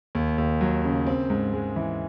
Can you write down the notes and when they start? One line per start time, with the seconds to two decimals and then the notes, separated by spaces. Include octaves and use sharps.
0.15 D#2
0.38 D#2
0.61 F#3
0.84 C#3
1.07 C4
1.30 G#2
1.53 G#3
1.76 E3